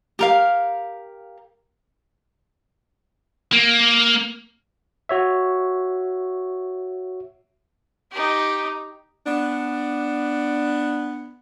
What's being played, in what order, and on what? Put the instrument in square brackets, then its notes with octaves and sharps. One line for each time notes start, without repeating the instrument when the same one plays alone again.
[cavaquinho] G4 A#4 F5
[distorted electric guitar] A#3
[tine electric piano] F#4 C#5 E5
[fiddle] D#4 G4
[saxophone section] B3 D4